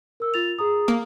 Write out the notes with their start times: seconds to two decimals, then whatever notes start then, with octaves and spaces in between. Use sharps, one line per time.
0.20 A#4 E6
0.34 F4 A6 F7
0.59 G#4 A#5 D#6
0.88 A#3